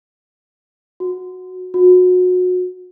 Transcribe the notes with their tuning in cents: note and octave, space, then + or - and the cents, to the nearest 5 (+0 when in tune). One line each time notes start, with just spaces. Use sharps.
F#4 -10
F#4 -25